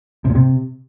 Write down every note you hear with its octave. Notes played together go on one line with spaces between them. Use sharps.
C3
A#2
C3